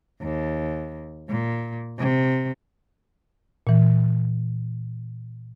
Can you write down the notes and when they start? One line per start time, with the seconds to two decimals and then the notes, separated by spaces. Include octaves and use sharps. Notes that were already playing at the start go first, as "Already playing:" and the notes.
0.21 D#2
1.29 A#2
1.98 C3
3.67 A#2 E3